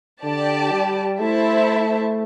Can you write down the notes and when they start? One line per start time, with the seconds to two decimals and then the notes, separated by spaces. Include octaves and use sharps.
0.23 D3 G4 D5 A5
0.71 G3
1.20 A3 E4 C5 E5 A5